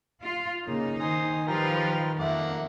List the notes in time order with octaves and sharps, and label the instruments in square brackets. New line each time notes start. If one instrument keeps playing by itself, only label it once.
[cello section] F4
[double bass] C#3 A#3 [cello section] D#4
[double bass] D#3 [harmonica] C5 C6 [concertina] G#5 D#6
[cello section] F3 F4 B4 [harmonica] G3 [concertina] A#4 G5
[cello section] F2 [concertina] A3 D6 [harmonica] A#3 E5 F#5